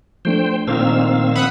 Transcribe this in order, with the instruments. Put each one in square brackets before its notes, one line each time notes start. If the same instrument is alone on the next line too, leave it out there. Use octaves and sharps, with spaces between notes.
[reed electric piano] F3 A3 D4 [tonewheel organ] C5 G5
[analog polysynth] A#2 D#3 [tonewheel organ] C4 F5 E6
[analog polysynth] F#5 B5 D#6